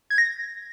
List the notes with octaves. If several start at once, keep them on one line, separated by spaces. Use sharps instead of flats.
G#6
A#6